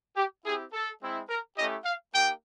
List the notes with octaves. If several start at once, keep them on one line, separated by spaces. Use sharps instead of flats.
G4
C4 E4 G4 G#4
A4
G#3 C4 E4
A#4
A3 C#4 E4 G4 D#5
F5
A#3 D#4 G4 G5